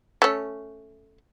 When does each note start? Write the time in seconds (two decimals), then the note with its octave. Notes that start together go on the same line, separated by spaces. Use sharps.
0.22 A3 C#4